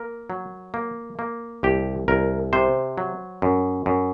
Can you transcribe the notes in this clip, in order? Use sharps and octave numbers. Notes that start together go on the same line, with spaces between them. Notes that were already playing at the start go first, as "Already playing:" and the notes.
Already playing: A#3 A#4
F#3
A#3
A#3
C2 G4
C2 A#4
C3 C5
F#3
F#2
F#2